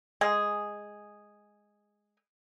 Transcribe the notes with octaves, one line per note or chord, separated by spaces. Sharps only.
G#3 G#4